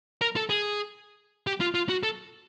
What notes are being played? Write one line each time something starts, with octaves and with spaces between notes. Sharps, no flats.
A#4
A4
G#4
G4
F4
F4
F#4
A4